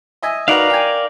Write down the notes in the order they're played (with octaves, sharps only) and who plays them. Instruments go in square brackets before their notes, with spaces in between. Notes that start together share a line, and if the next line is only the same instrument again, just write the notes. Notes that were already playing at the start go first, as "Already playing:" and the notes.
[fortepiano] D#5 E5 G#5
[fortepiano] D#4 F#4 B4 [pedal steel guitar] A#4 D5 F5
[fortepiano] G5 G#5